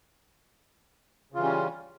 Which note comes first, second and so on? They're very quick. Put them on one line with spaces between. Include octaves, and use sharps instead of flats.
C#3 F4 E3 G3 C#4